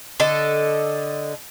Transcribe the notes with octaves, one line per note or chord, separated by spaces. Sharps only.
D3 A4 D#5